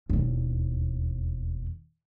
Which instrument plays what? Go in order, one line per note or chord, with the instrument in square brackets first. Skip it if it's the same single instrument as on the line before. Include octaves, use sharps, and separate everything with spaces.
[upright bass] E1 D#2